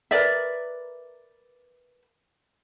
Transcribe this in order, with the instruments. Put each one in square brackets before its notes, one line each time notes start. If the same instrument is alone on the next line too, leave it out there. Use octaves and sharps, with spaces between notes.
[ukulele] A#4 B4 D5 E5